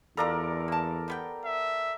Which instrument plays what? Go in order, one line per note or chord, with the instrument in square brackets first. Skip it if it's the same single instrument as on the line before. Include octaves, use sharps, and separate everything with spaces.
[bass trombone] E2 [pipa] B2 F4 A#5 [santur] A4 A#4 D5
[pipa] A#3 A5
G3 B3 G5
[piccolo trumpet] E5